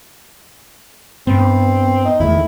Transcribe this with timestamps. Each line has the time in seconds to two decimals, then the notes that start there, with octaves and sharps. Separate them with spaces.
1.27 G2 B3 C4
2.05 D#4
2.20 E2 D#3 A3 E4